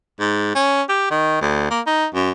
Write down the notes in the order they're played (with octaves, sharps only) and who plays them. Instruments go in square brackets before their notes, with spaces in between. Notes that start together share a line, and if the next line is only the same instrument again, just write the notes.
[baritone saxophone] G#2
C#4
G4
D#3
D2
A#3
D#4
F#2